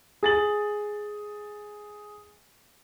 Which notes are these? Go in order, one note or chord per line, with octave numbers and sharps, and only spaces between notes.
G#4 A6 F#7